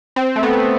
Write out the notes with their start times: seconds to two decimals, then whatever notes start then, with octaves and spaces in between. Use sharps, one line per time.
0.16 C4
0.36 A3
0.43 B3